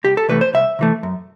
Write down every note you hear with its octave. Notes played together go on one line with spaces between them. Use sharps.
C2 G4
A4
C3 E3 A3 B4
C5
C2 E5
C3 E3 A3
F#2